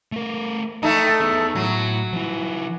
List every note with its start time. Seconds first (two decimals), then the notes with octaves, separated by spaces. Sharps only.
0.12 A3 A#4
0.83 A3 D#4 G5 A5
1.20 B3 G#4
1.55 A2 F#3
2.13 F3 E4